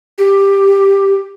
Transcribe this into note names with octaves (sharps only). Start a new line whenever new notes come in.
G4